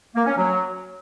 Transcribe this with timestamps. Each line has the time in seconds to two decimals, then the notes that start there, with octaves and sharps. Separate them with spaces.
0.15 A#3
0.26 C#4
0.37 F#3